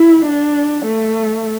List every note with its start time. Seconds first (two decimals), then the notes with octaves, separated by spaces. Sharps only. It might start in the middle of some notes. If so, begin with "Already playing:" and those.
Already playing: E4
0.26 D4
0.85 A3